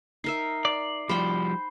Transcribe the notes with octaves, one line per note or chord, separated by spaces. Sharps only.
D#4 A#4 E5 C7
D5
F3 G3 C5 G5 B5